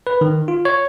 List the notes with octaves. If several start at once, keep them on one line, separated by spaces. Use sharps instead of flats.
B4
D#3
F4
C#5